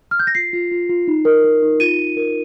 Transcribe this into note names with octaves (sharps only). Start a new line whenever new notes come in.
F6
G6
A#6
F4 C7
F4
F4
F4
D#4
A#4
A#4
D#4
F4 D#7
F4
A#4